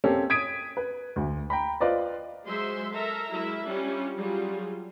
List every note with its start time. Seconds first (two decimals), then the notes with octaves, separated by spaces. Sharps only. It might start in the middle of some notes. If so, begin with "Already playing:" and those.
0.04 A#3 C4 C#4 G4 A4
0.30 D#6 G#6 B6 D7 D#7
0.77 B4
1.16 D2
1.50 G5 A#5 B5
1.80 F4 B4 C5 D5 D#5
2.47 F#3 G#3 G#4 C5 E5 C6
2.92 A4 A#4 E5 A#5
3.30 F#3 G#3 E4 A#4 E5
3.66 G3 C#4 D4 F4
4.17 F#3 G3 F4 G#4